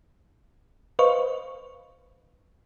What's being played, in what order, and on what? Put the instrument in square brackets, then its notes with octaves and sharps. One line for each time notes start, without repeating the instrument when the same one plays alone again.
[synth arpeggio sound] B4 C5 D#5 F5 C#6